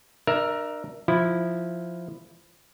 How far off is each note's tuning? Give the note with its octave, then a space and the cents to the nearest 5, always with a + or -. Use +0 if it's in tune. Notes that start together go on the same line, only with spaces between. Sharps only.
D4 +45 A#4 +15 E5 +10
F3 +0 E4 +0